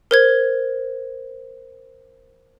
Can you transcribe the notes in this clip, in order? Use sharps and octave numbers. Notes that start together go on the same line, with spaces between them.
A#4 C5 G#6